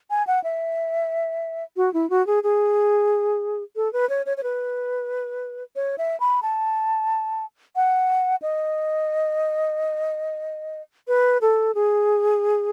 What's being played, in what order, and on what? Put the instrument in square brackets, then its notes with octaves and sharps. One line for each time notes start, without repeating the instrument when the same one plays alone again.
[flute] G#5
F#5
E5
F#4
E4
F#4
G#4
G#4
A4
B4
C#5
C#5
C#5
B4
C#5
E5
B5
A5
F#5
D#5
B4
A4
G#4